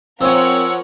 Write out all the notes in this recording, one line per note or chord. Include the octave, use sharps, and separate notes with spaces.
F3 C4 C#4 A#4 C#5 F#5 E6